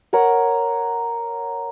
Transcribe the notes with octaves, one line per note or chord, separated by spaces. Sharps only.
A#4 C#5 F#5